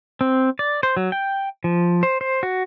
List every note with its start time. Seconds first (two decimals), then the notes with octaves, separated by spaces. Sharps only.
0.21 C4
0.59 D5
0.83 C5
0.97 F#3
1.12 G5
1.64 F3
2.03 C5
2.21 C5
2.43 F#4